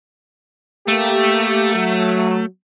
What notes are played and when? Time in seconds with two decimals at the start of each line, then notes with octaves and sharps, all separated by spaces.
0.88 A3 A#3 G4
1.74 F#3